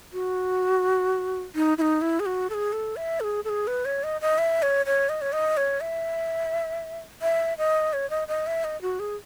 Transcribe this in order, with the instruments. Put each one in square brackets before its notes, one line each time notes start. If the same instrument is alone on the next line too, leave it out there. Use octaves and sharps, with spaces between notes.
[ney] F#4
D#4
E4
D#4
E4
G#4
F#4
A4
G#4
A4
E5
A4
G#4
A4
G#4
B4
C#5
D#5
D#5
E5
C#5
C#5
D#5
C#5
D#5
C#5
E5
E5
D#5
C#5
D#5
D#5
E5
D#5
F#4
G#4